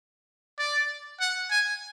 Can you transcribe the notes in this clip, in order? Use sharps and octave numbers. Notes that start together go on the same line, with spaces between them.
D5
F#5
G#5